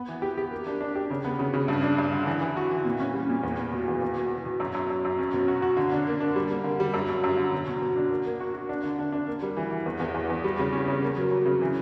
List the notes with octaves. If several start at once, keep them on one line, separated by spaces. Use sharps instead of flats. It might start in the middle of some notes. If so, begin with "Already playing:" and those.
Already playing: B3
E3
G4
G4
A#3
D4
D4
G4
C#3
B3
C#3
C#3
G2
D4
G2
D3
E3
E3
F#4
E3
A#2
C#4
G3
A#2
E2
B3
B2
E2
E2
B2
B2
B2
F#2
F#2
F#2
F#2
C#4
B2
F#4
F#4
D3
D4
A#3
D4
G3
A#3
D3
G3
F#2
F#2
F#2
D3
B2
B2
B2
D4
A#3
A#3
F#4
F#4
D4
D3
D4
D4
A#3
G3
E3
E3
E2
E2
E2
E2
G3
C#3
C#4
C#3
A#3
F#3
F#3
C#3
E3